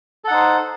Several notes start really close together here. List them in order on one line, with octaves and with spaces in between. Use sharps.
A4 F#5 D#4 C5